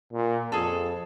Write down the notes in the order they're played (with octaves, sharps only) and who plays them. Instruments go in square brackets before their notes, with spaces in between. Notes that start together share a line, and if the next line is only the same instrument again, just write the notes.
[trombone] A#2
[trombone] F2 [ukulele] G#4 A4